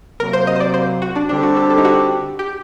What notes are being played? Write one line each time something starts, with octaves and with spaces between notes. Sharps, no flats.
C3 F#3 A#3 A#4
C5
D#5
C5
D5
C5
F#4
D4
D3 G3 C4 D4 G4
F#4
A4
A4
D#4
F#4
G4